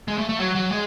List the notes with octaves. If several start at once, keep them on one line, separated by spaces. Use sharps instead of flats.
G#3
A3
A3
F#3
F#3
G#3